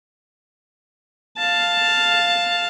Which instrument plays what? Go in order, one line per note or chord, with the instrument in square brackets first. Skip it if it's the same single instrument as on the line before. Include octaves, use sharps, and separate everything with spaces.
[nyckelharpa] F5 A5